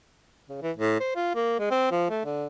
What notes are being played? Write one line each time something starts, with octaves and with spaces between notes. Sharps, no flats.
C#3
E3
A2
C5
F4
A#3
G#3
C4
F3
A3
D3